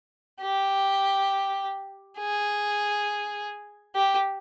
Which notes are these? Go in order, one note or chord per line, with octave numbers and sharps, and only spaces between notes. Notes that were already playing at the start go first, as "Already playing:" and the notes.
G4
G#4
G4